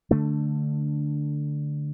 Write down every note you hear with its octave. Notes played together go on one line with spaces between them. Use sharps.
D3 A3 D4